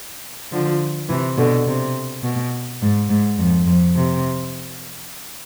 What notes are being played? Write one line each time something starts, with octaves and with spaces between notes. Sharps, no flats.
D3 F3
C3 E3
B2 D3
C3
B2
G#2
G#2
F2
F2
C3